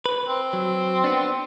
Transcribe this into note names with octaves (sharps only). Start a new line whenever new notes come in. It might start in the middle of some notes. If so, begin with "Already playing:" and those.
B4
C4
F#3
B3 D4